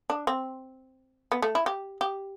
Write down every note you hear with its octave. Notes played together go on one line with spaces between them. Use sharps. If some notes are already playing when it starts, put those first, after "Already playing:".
D4
C4
B3
A3
E4
G4
G4